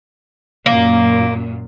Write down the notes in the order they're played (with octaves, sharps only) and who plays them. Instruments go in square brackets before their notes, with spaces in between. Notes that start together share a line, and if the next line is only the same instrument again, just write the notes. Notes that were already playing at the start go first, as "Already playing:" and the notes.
[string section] F#2 A#2 [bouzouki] A#3